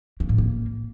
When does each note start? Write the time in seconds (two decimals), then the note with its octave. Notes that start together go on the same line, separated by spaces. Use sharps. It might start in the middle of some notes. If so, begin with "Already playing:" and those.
0.20 A#3
0.29 A2
0.38 A#3